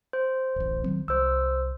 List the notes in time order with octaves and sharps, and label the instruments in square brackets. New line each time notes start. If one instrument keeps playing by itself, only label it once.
[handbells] C5
[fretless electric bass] D1 A1
D#3 F#3 C4
[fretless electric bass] C2 [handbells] C5 E6